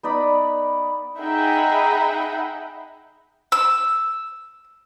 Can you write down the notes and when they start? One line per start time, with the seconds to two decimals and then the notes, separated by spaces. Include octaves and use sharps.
0.03 B3 D#4 D5 B5
1.19 D#4 G#4 E5 F#5 G5 B5
3.52 E6